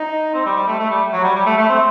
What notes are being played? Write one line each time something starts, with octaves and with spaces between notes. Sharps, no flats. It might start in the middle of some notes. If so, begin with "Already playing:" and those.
Already playing: D#4
C4
G3
G3
A3
A3
G3
F#3
G3
G3
A3
A3
C4